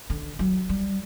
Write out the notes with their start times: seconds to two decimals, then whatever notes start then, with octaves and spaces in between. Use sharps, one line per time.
0.10 D3
0.39 F#3
0.69 G3